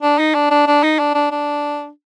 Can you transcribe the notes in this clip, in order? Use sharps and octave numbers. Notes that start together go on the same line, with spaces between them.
D4
D#4
D4
D4
D4
D#4
D4
D4
D4